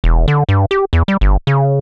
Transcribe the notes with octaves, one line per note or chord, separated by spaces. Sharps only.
E1
D3
G2
G4
E2
G3
G1
C#3